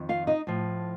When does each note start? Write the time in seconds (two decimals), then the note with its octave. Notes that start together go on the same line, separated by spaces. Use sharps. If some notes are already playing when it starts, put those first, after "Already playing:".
Already playing: F2 D#3
0.09 F4 F5
0.27 D#4 D#5
0.47 A2 F3